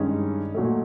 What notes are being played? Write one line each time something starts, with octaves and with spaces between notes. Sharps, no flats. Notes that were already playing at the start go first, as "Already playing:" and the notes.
Already playing: G2 D#3 G#3 C#4 D#4
A#2 F#3 A3